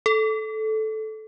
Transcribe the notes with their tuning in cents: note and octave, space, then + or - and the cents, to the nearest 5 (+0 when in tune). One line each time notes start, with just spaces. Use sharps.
A4 -10